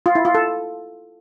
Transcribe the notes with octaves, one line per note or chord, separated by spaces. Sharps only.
F4
E4
F4
A4